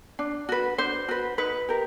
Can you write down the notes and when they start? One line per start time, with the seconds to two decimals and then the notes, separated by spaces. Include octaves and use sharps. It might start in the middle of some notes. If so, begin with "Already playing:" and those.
0.19 D4
0.49 F#4 B4
0.78 D4 C5
1.09 F#4 B4
1.38 D#4 B4
1.69 G4 A#4